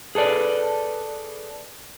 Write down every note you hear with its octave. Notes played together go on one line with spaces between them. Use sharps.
G#4 A4 B4 D5